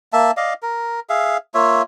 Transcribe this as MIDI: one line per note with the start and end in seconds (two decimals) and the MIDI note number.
0.13 0.31 58
0.13 0.31 76
0.13 0.31 81
0.37 0.54 74
0.37 0.54 75
0.37 0.54 77
0.63 1.00 70
1.09 1.37 68
1.09 1.37 76
1.09 1.37 77
1.54 1.82 58
1.54 1.82 65
1.54 1.82 73
1.54 1.82 76